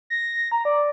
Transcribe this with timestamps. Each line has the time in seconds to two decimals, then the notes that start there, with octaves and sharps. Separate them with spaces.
0.10 A#6
0.52 A#5
0.65 D5